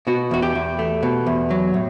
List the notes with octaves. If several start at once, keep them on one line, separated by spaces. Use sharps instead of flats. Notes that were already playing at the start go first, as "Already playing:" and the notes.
B2 F#4
E2 F#4
G4
E2
A3
B2
E2
F#3
A2